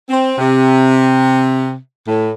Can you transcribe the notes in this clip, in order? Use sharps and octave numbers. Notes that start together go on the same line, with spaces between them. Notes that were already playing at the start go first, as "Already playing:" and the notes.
C4
C3
A2